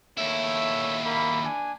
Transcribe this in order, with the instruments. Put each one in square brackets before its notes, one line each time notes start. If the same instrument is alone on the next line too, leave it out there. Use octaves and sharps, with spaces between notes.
[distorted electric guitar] D#2 E4 [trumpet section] A3 C#5 E5
[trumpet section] A#3 B5
D4 G#5